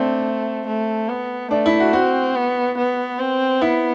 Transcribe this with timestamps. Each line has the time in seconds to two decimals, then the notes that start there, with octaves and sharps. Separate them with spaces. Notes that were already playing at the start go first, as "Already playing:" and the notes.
Already playing: A3 C4 D4
0.67 A3
1.09 B3
1.51 A3 D4
1.66 E4
1.80 F#4
1.93 C4 F#4
2.36 B3
2.78 B3
3.20 C4
3.62 B3 E4